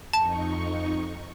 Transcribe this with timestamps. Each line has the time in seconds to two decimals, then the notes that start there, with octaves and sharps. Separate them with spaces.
0.13 F2 D#4 A5 C#6